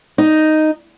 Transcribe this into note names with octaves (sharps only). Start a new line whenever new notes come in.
D#4